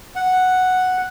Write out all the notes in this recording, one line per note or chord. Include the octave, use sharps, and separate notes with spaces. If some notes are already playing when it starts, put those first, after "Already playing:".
F#5